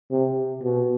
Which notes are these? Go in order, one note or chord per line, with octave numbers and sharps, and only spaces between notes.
C3
B2